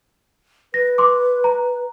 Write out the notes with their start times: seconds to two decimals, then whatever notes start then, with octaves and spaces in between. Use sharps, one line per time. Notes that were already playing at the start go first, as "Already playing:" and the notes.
0.74 B4 A#6
0.98 C6 D6
1.44 A#5